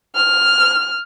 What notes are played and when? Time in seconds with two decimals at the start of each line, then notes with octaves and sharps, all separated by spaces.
0.15 F6